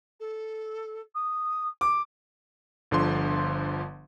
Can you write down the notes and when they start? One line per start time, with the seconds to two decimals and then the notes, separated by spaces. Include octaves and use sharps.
0.20 A4
1.15 D#6
1.81 D6
2.91 G1 D3 F3 C6